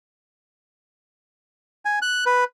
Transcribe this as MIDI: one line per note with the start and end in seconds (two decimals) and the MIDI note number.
1.85 1.99 80
2.02 2.24 90
2.26 2.44 71